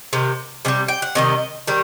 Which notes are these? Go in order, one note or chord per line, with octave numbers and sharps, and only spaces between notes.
C3 D#3
C3 D#3 G3
G5
F#5
C3 D#3 G3 D#5
D#3 G3